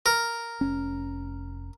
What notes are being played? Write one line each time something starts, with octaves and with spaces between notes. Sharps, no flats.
A#4
F1 C#4